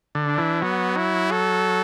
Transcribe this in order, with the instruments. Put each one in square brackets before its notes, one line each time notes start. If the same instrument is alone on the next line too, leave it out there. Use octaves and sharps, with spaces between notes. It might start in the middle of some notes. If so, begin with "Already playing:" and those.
[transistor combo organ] D3
[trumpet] D4
[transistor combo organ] E3
[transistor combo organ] F#3 [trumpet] B3
[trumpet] E4
A4